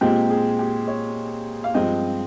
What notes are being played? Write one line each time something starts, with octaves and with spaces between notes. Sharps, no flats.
A#2 G#3 C4 G4
G#4
G4
C#5
F5
G2 F3 G#3 C4 D#5